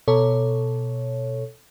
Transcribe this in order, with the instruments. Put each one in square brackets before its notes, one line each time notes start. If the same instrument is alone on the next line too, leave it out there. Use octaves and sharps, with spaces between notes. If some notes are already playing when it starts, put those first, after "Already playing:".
[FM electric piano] B2 A4 C#5